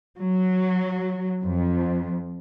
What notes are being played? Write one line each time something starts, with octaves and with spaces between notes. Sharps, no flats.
F#3
F2